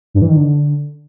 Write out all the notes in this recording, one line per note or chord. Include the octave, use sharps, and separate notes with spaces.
G2
E3
D#3
D3